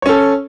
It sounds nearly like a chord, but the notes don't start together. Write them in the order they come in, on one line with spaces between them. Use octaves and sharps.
C#5 C#4 A4